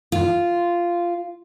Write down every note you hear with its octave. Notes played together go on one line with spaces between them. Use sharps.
F4